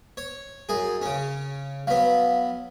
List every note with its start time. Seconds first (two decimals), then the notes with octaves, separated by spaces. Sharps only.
0.17 C#5
0.69 F#2 G#4
1.02 C#3 C#4
1.87 F#3 B3 F5